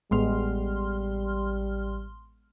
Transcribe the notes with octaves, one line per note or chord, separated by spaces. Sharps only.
A1 G3 G#3 B3 C6 F6